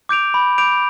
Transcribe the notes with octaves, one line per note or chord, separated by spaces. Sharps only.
D6 G6 D7 F7
B5
D6 G6 D7 F7